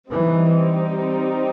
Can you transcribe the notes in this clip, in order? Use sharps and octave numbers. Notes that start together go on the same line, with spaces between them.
E3 G3 C4 D#4 G4